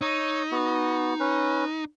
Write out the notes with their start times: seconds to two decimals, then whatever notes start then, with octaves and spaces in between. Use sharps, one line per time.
0.01 D#4 C#5 E6
0.52 B3 F#4
1.20 C#4 B4